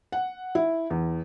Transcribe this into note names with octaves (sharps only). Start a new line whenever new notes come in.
F#5
E4
E2